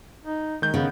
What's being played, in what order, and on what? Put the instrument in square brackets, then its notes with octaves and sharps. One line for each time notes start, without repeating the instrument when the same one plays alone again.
[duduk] D#4
[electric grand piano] D#3 G6 [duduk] G#3
[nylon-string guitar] C#3 [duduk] B3